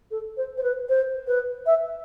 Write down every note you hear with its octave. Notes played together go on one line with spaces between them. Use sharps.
A4
C5
C5
B4
C5
B4
E5